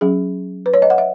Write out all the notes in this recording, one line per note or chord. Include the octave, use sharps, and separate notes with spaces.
F#3 C#4 G#4
B4
C#5
D#5
F#5
E5